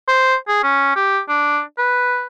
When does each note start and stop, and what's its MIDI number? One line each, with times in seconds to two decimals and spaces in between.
0.08 0.35 72
0.48 0.62 68
0.63 0.91 61
0.96 1.20 67
1.29 1.60 62
1.78 2.27 71